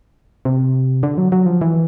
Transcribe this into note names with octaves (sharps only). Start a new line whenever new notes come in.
C3
D3
F#3
F#3
F3
E3